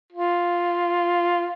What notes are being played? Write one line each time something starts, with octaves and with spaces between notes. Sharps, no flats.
F4